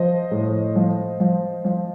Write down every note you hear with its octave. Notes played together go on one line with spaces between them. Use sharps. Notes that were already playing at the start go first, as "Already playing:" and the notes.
Already playing: F3 C5 D#5
A2
F3
F3
F3